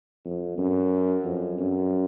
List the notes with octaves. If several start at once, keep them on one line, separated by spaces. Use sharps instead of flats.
F2
F#2
F2
F#2